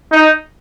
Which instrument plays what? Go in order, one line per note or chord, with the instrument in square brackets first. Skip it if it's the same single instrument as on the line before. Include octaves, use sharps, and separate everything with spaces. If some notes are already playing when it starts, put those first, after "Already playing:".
[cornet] D#4